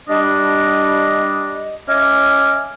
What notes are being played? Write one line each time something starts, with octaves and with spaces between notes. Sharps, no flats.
G3 D4 D#5
C#4 D#5 E5 G#5 D6 F6